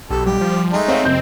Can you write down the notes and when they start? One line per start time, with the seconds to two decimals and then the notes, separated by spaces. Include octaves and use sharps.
0.10 B1 G4 A4
0.26 G3 G4
0.41 F3
0.72 G#3 A3 D#4
0.88 C4 C#5 E5 F5
1.05 F#1 D#5 G6